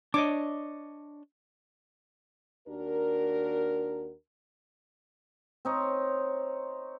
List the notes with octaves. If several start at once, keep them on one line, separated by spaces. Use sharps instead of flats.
D4 C#5 D#5 D6
D#2 D4 F#4 A#4
C4 D#4 C#5